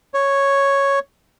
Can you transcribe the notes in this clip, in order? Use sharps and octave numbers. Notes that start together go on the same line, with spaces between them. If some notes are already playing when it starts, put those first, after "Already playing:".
C#5